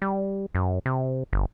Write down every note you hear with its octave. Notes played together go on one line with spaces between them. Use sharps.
G3
F#2
C3
G1